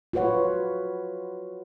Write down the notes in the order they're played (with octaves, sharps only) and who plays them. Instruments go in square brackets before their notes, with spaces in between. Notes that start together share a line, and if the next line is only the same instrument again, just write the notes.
[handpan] F4 F#4 B4 C#5 F#5